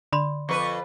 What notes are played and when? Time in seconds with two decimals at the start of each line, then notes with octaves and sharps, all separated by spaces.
0.12 D3 D5 B5 C6
0.49 F2 B4 C#6